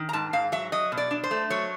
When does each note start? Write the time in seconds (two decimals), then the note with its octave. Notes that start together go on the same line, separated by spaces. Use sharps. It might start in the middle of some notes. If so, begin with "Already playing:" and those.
Already playing: D#3
0.09 A#5
0.13 G#2 A5
0.33 G#2 F5
0.52 F#3 E5
0.72 F#3 D#5
0.92 B2
0.97 D5
1.11 D4
1.23 C5
1.31 A3
1.50 F#3 C#5